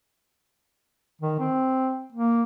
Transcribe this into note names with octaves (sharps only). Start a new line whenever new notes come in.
D#3
C4
A#3